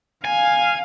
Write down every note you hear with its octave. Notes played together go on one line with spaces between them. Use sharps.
F5 G#5